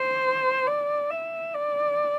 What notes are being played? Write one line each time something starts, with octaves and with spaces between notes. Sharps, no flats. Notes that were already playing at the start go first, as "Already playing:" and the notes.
Already playing: C5
D5
E5
D5